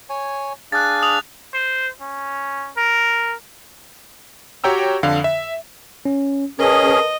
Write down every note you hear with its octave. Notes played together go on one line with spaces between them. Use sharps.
C#5 G#5
D4 G#4 F5 F#6 A6
D#6 F7
C5
C#4
A#4
F#4 G4 C#5 G5 A#5 E6
F2 D3 F5
E5
C#4
C#4 G#4 A#4 B4 D#5 A5